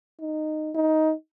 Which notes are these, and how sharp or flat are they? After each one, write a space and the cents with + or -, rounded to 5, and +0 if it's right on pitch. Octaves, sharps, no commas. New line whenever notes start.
D#4 -10
D#4 +15